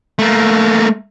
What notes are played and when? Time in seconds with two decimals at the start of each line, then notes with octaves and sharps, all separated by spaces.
0.19 A3 A#3